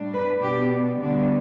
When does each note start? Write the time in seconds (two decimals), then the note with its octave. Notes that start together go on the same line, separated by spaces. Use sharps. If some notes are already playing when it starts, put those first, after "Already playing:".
Already playing: A2 G3 D4
0.13 B4
0.42 B2 B3 D4 G4
0.98 D2 D3 G3 B3 D4